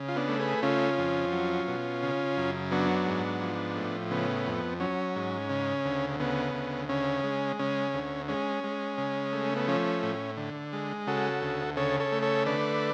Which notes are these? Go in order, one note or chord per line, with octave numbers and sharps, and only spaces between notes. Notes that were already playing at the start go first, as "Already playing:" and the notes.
Already playing: C#3
F4
B3 D4
A3
G#4 B4
C#3 C#4 F4
F2
F#3
B2
C#3
F#2
F#3 B3 D4
G#2
F3
A2
C#3 B3
F2
F#3 C#4
G#2
C#3
D2
C#3 B3
D2
C#3 C#4
G#3
C#3 C#4
D2
G#3 C#4
G#3
C#3
A3
B3
F3 C#4
A2
D3
G#3
C#3 F#4 A4
D2
C#3 A4 C#5
A4 C#5
A3
A4 C#5
D3 B4 D5